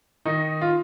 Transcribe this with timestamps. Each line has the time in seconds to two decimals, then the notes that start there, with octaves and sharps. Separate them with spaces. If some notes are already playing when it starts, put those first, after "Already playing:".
0.26 D#3 D#4
0.61 F4